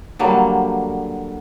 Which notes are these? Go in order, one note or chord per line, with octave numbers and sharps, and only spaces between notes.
D3 F#3 G3 A#3